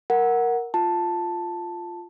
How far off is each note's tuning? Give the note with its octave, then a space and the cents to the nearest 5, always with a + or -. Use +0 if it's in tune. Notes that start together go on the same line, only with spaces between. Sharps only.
A#4 +0 F#5 +0
F4 +0 A5 +0